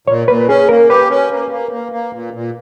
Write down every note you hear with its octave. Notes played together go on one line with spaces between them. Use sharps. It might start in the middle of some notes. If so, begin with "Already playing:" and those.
A#2 C#5
A#2 B4
C#4 G#4
A#3 A#4
G4 B4
C#4
A#3
A#3
A#3
A#3
A#2
A#2